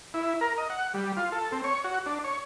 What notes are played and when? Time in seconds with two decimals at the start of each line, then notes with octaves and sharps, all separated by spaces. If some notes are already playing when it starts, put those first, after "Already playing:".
0.14 E4
0.41 A#4
0.58 D#5
0.70 F#5
0.94 G3
1.17 F4
1.32 A4
1.52 C4
1.64 C#5
1.84 F#4
2.06 D4
2.24 C#5